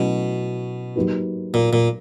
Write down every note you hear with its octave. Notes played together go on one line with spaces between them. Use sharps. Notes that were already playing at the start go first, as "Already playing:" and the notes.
Already playing: B2 F#3 A3 C#4 E4
F#3 A#3 D#4 G4 B4
A#2
A#2